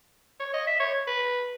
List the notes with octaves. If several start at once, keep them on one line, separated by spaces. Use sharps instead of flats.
C#5
D#5
E5
C#5
B4